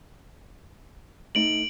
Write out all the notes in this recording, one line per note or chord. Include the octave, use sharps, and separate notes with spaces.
A3 D#4 D7 F#7